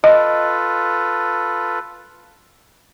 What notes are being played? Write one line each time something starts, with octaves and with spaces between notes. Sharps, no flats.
F4 A4 B4 D#5